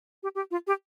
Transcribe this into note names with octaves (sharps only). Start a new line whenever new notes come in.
G4
G4
F4
G4